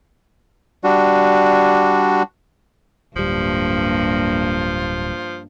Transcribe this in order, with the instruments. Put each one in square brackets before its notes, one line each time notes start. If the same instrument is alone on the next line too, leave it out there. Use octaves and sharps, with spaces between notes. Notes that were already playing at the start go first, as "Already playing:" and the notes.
[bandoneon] G3 D4 F#4
[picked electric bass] D1 G3 [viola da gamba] G2 A#3 [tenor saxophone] F3